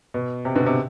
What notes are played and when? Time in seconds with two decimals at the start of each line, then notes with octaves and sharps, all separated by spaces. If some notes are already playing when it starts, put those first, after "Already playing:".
0.14 B2
0.45 C3
0.55 B2 D3
0.66 C3